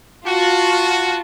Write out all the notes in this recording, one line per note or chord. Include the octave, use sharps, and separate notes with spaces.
F4 F#4 A5